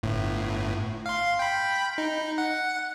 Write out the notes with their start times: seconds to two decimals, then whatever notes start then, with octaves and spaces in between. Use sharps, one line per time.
0.03 G1 A2
1.06 F5 C6
1.39 G5 B5
1.98 D#4
2.38 F#5